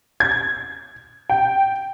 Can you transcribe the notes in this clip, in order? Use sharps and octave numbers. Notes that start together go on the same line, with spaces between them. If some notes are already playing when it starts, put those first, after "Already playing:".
G#6
G5